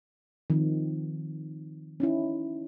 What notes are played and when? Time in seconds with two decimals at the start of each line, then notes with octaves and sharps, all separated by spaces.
0.50 D#3 F3 C4
2.00 C#4 D#4 E4